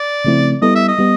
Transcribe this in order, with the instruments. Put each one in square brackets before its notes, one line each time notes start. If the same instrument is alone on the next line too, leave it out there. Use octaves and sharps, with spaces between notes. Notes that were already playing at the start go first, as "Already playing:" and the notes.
Already playing: [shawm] D5
[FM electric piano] C#3 F3 A3 C4 E4
[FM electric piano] G3 B3 E4 A4 [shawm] D#5
[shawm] E5
D#5
[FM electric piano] G3 B3